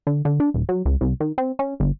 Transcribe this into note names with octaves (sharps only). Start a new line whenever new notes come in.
D3
D3
D4
D#1
F#3
C#2
C2
D#3
C4
C#4
G1